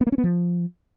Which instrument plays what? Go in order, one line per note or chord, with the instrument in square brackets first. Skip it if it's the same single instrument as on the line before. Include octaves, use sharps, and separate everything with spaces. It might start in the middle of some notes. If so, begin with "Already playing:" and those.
[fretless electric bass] B3
A#3
C#4
B3
F3